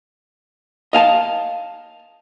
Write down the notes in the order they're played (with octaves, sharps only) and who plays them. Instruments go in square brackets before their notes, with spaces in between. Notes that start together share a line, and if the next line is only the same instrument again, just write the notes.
[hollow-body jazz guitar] D#5 F5 G#5 A5